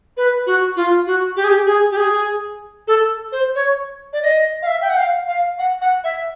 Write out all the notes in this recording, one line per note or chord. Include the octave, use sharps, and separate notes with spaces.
B4
F#4
F4
F#4
G4
G#4
G4
G#4
G4
G#4
A4
C5
C#5
D5
D#5
F5
E5
G5
F#5
F5
F5
F#5
F#5
E5